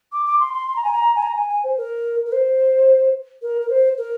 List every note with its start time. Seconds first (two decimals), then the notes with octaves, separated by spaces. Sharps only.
0.12 D6
0.26 D6
0.39 C6
0.53 C6
0.67 C6
0.76 A#5
0.84 G#5
0.92 A#5
1.15 G#5
1.22 A#5
1.36 G#5
1.49 G#5
1.63 C5
1.77 A#4
2.25 A#4
2.32 C5
3.42 A#4
3.61 A#4
3.69 C5
3.97 A#4